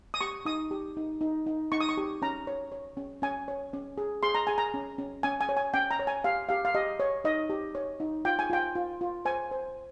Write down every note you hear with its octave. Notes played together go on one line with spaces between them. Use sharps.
D#6
G4 C#6
D#4 D#6
G4
D#4
D#4
D#4
D#4 C#6
D#6
C#6
G4
C#4 A#5
C#5
C#5
C#4
C#4 G#5
C#5
C#4
G#4
G#4 C6
A#5
G#4 G#5
A#5
C#4
C#4
C#4 G#5
G#5
C#5
G#5
C#4 G5
A#5
C#5
G#5
G4 F5
G4 F5
F5
G4 D#5
C#5
D#4 D#5
G4
C#5
D#4
F4 G5
G#5
F4 G5
F4
F4
C5 G#5
C5